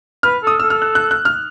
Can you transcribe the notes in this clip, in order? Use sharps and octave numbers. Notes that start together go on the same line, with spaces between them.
B4 F6
A4 D#6
A4 E6
F6
F#6
F#6
F#6
F6